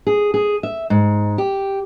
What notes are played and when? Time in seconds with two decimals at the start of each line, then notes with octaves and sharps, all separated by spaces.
0.07 G#4
0.34 G#4
0.63 E5
0.90 G#2
1.38 G4